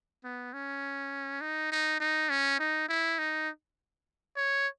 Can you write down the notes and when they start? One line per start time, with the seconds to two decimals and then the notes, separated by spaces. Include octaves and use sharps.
0.24 B3
0.54 C#4
1.41 D#4
1.72 D#4
2.00 D#4
2.30 C#4
2.60 D#4
2.89 E4
3.18 D#4
4.37 C#5